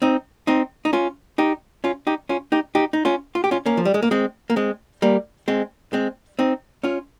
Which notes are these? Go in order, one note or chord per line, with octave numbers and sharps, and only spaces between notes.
C4 D#4
C4 D#4
D#4
C#4 F4
D#4 G4
C#4 F4
D#4 G4
C#4 F4
D#4 G4
D#4 G4
D#4
C#4 F4
F4
G4
C#4 F4
A#3 C#4
F3
G3
G#3
A#3
G#3 C4
A#3
G#3 C4
G3 A#3
G#3 C4
G#3 C4
C4 D#4
C#4 F4